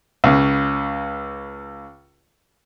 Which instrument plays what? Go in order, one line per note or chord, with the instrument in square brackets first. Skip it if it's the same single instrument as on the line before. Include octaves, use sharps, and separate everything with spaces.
[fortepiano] C#2 C#3